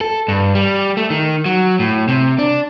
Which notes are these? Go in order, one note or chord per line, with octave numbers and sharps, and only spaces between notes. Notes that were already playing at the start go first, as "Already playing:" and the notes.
A4
G2
G3
A3
D#3
F#3
A2
C3
D4